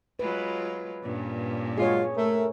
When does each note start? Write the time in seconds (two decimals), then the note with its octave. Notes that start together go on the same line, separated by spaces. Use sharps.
0.19 F#3 G#3 F4 B4
1.03 G2 A#2 C#4
1.78 F#3 G#3 F4 G#4 C#5
2.17 A3 A#4